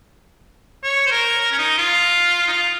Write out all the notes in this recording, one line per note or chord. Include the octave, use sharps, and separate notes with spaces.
C#5
C5
A#4
A#4
C#4
D#4
F4
D#4
F4